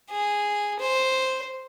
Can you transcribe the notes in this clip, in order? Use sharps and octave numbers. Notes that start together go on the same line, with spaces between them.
G#4
C5